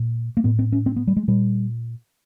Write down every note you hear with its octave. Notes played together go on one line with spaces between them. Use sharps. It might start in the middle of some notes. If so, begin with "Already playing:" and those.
Already playing: A#2
A#3
A2 B3
C4
C#4
C4
B3
G3
G#3
A#2 G3